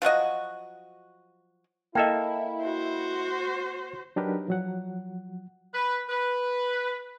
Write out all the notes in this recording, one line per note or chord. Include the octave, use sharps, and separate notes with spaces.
F3 F#3 F#4 D#5
A#3 E4 A4 D#5 E5 G5
F#4 C5
F#3 D4 D#4 G4 A#4 B4
F3 F#3 F#5
B4
B4